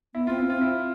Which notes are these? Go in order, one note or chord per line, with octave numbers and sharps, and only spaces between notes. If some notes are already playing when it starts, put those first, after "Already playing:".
B3 E4
C4 F4
E4
C4 F4
E4